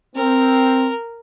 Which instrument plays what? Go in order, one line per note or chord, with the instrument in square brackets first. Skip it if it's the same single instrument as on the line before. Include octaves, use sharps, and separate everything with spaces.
[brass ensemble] C4 [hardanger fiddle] A#4